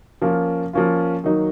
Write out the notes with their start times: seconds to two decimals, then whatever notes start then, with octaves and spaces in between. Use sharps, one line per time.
0.22 F3 A#3 C#4 F4
0.73 F3 A#3 C#4 F4
1.24 D#3 F#3 A#3 D#4